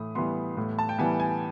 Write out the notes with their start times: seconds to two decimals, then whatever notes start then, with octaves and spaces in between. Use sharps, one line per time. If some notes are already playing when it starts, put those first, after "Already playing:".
Already playing: A2 E3 D#6
0.15 E3 G3 B3 C6
0.57 A2
0.79 A5
0.89 G5
0.99 E3 G3 B3 G#5
1.20 G#5